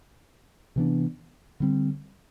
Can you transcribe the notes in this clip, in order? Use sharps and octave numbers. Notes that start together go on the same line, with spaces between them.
C3 E3 B3 D4
D3 G3 C4